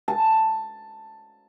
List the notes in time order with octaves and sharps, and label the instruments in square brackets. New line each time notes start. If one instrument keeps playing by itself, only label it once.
[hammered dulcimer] A5